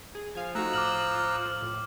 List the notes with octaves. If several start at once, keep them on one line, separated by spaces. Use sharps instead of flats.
G#4
F3 F5 G#5
A3 D#4 F#4 A#5 E6 F#6
A2 D6 F6 F#7
A2